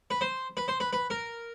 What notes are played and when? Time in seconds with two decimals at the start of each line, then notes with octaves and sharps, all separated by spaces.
0.11 B4
0.21 C5
0.57 B4
0.68 C5
0.80 B4
0.93 B4
1.10 A#4